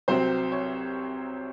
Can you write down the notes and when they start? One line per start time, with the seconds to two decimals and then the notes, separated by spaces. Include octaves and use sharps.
0.08 C2 C3 F#3 C4 C5
0.52 C#5